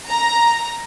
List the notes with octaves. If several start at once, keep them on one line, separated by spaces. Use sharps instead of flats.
A#5